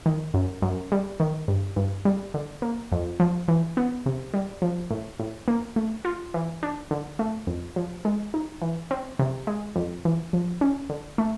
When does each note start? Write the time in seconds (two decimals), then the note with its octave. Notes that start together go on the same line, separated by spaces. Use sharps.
0.06 D#3
0.34 F#2
0.62 F#2
0.92 G3
1.20 D#3
1.48 G2
1.76 G2
2.05 G3
2.34 D3
2.62 A#3
2.92 F2
3.20 F3
3.48 E3
3.77 B3
4.06 C3
4.34 G3
4.62 F3
4.91 A2
5.19 A2
5.48 A#3
5.76 A3
6.05 F4
6.34 E3
6.63 D4
6.91 D3
7.19 A3
7.47 F2
7.76 F3
8.05 G#3
8.34 D#4
8.62 E3
8.91 C4
9.19 C3
9.47 G#3
9.76 F2
10.05 E3
10.33 F3
10.61 C#4
10.90 D3
11.18 A3